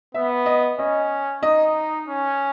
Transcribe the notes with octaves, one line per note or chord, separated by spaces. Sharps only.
B3 E5
D#5
C#4 D#5
D#4 D#5
C#4